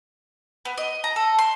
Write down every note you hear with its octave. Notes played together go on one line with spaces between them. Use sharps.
B3
D#5
A#5
A4
C6